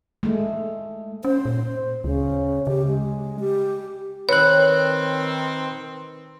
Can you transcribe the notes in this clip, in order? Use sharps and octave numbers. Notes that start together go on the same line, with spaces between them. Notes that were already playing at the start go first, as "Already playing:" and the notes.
G#3 A3
C#4 C5
A#2
D2 C#3
C#3 G4
G#3
G4
D#3 C4 B4 C#5 F#6